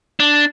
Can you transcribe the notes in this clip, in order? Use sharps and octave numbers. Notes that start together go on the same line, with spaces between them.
D4